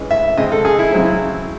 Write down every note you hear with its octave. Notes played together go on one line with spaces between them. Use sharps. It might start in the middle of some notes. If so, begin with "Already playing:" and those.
Already playing: E3 G#3 C#4
E5
C#3 G#3 C4 D#5
A4
G#4
E4
C#3 F#3 C4 E4